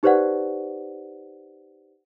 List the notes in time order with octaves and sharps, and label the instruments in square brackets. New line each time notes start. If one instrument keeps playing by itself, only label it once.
[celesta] D#4 G4 B4 C5 D5 F#5